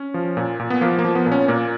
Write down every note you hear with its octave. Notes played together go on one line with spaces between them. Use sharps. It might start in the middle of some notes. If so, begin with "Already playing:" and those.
Already playing: C#4
F3
A#2
A#2
B3
F3 A#3
A#3
F3
B3
A#2
C#4
A#2 A#3